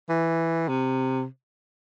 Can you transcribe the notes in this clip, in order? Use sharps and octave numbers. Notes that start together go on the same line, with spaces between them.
E3
C3